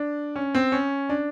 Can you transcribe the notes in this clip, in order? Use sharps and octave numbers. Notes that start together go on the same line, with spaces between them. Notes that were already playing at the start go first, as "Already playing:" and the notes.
Already playing: D4
C#4
C4
C#4
D4